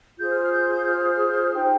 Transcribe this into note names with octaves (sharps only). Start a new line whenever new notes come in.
F4 G#4 C5 G6
F6
F6
G6
G6
F6
D#4 G4 C5 G5